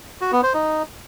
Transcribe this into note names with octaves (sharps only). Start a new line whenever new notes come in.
F#4
B3
C5
D#4